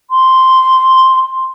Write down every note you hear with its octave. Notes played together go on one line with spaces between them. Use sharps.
C6